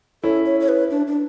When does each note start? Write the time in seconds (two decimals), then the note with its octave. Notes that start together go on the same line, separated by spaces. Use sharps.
0.24 C#4 E4 A4
0.46 C#5
0.60 C#5
0.68 B4
0.91 D4
1.07 D4